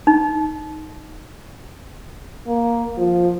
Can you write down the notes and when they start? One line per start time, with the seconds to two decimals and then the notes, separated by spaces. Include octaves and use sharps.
0.07 D#4
2.47 A#3
2.98 F3